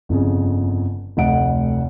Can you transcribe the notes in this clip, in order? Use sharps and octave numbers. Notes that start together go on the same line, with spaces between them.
G1 F2 C#3
F1 D2 D#5 E5 F#5 D7